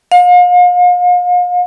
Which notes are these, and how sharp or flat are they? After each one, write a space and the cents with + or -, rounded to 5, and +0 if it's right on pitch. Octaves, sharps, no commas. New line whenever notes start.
F5 +40